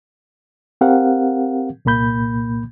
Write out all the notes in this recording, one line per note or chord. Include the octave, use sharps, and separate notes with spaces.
C4 G4 A#4 F5 F#5
C2 A#2 A#3 B5 G6